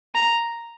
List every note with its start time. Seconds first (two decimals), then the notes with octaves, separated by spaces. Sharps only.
0.15 A#5